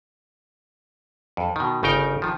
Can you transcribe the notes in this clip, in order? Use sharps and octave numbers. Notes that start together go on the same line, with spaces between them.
F2
B2 D#3
G1 C#3 D#4 A#4 G5
D#3 F3